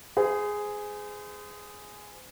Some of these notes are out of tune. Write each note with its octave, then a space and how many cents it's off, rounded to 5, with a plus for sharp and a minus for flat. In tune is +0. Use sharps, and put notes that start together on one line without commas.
G#4 +0 C5 -40